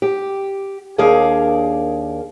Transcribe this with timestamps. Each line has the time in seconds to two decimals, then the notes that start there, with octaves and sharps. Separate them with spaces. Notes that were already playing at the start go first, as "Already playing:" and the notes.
0.02 G4
0.98 D#2 D4 G#4 A#4 F5